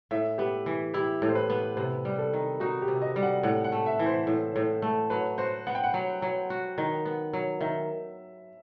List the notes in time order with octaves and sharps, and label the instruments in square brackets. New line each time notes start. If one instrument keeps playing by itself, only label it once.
[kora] A2 [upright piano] E5
[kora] B3 [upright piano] G4
[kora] E3
[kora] E4 [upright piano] G4
[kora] A2
[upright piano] C5
B4
[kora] B3
[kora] C3 [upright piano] B4
[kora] G3
[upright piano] A4
[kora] D#3
[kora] D#4 [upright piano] F#4
[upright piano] G4
[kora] C3
[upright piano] D#5
[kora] G3
[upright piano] F#5
[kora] A2 [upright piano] F#5
[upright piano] F#5
[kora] A3
[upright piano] E5
[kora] E3
[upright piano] C5
[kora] A2
A2
A3
[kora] F#3 [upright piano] B4
[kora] F#4 [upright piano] C5
[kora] B3 [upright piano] F#5
[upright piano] G5
F#5
[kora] F#3
F#3
F#4
D#3
B3
F#3
[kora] D#3 [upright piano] E5